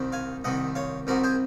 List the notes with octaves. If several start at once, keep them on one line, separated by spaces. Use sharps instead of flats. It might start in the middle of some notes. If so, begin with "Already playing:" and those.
Already playing: C2 C3 D#3
F5 G#5
C2 C3 D#3 D#5 F#5
C#5 F5
C2 C3 D#3 F#4 A#4
G#4 C5